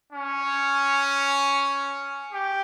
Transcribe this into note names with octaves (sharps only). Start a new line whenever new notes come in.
C#4
G4